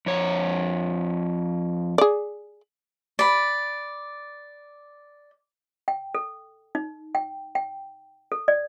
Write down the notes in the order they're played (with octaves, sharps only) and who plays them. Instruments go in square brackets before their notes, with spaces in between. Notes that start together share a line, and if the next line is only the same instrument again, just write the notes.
[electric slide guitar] F2 C#5
[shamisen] G#4 D5
[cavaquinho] D5 B5
[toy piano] G5
A4
D#4
G5
G5
A4
D5